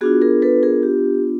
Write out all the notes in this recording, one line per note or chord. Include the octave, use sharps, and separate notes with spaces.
B3 D4 F4 F#4 G#4
G#4 A#4
A4 B4
G#4 A#4
G4